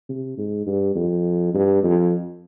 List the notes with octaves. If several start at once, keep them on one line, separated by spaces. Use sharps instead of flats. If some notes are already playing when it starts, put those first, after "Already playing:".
C3
G#2
G2
F2
G2
F2